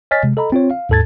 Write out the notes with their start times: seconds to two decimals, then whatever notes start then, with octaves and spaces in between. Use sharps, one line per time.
0.11 C#5 D#5 G#5 F6 A6 B6
0.23 C3 G#3
0.37 A4 D#5 A#5 B5
0.52 C4 F4 C#5
0.71 F5
0.89 D#2 G#2 A4 A5 G#6 A6